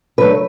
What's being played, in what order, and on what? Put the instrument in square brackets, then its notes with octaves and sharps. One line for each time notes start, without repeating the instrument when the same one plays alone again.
[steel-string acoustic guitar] D3 F#3 A3 B4